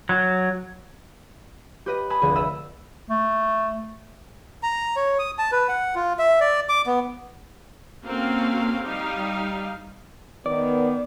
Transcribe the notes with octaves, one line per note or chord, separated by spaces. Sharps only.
F#3
G4 B4 D#5
G#5 A5 B5 D#6
F1 D2 D3 G#4
A4 D#5 E5 B5 E6
A3
A#5
C#5
D#6
A5
B4
F#5
F4
E5
D5
D6
B3
A#3 C4 C#4 F#4 A4 F5
G3 D#4 F5
D#3 B3 D5